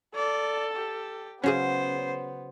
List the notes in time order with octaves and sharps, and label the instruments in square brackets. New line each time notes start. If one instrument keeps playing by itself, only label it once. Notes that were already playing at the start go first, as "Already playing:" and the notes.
[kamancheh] A4 [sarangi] D5
[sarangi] G4
[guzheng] C#3 F#3 [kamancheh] B3 [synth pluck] C#4 G#4 [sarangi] C5